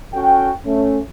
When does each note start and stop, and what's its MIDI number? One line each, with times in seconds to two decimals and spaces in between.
0.14 0.50 61
0.14 0.50 66
0.14 0.50 69
0.14 0.50 79
0.66 1.00 57
0.66 1.00 61